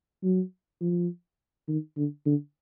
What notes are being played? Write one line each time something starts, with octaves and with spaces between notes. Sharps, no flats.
F#3
F3
D#3
D3
D3